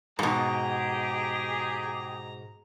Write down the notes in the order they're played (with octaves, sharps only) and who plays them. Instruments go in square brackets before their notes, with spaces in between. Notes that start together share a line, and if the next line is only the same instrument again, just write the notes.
[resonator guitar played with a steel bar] G#2 B2 [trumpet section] G4 G#4 [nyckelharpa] A#5